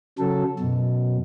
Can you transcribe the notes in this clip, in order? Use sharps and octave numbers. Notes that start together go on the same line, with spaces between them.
C#3 F#3 A4
F#2 B2